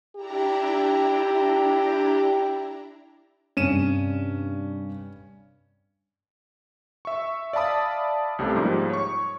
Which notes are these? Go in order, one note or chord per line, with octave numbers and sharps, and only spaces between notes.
D4 E4 G4 A#5
G2 C3 C#4 D#7 E7
E5 C#6
D5 E5 F5 A5 B5 D#6
C2 C3 G3 A3 C#4
G#2 F3 G3 A#3
C#5 C#6